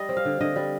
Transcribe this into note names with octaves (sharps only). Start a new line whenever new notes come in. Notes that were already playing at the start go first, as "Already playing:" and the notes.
Already playing: G3 D#5
C4
F5
D3
D3 D#5
G3